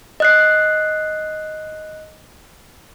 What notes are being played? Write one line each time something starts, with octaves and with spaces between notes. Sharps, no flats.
D#5 F#6 C7